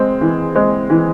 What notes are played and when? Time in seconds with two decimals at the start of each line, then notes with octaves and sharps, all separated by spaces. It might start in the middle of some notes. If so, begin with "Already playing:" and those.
Already playing: G#3 C4
0.21 E3
0.55 G#3 C4
0.90 E3